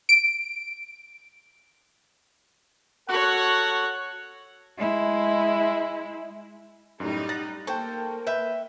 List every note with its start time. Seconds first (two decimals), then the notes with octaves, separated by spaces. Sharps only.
0.09 D7
3.09 F#4 A4 C#5 F#5
4.77 G#3 E4
7.00 F#2 A2 G3 D#4
7.29 F#5 A6 A#6
7.67 A#3 A4 C5 G5 A5 C#6
8.27 B4 E5 G5 B5